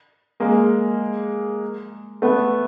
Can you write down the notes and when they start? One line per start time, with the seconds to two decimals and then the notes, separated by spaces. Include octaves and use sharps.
0.40 G#3 A#3
2.22 A3 B3